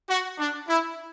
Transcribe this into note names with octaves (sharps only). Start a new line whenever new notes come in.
F#4
D4
E4